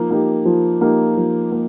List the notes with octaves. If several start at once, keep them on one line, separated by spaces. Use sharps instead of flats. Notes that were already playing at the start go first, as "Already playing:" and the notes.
Already playing: F3 A#3 D#4
A#3 D#4 G4
F3
A#3 D#4 G4
F3
A#3